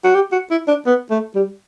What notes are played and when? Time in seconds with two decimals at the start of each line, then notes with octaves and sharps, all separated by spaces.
0.04 F#4
0.15 G4
0.32 F#4
0.51 E4
0.68 D4
0.86 B3
1.11 A3
1.35 G3